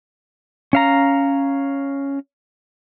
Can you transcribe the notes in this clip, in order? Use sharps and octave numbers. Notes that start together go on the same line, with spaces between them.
C#4 F5 A#5